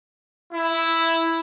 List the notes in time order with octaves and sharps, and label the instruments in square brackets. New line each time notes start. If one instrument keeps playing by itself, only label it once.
[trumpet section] E4